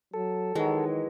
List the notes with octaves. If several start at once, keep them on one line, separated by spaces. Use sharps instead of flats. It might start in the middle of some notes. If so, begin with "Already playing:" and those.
F#3 A4
D#3 E3 F#3 G#3